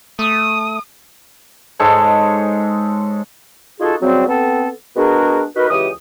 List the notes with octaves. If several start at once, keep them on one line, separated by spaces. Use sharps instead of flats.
A3 D#6
G#2 G#3 A4 C#5
D#4 F4 F#4 G#4 A4
C#3 F#3 G3 C4
B3 C4 A4
G#3 B3 D4 F#4 G#4 A#4
D#4 F#4 A#4 B4
C#2 E3 G4 D#6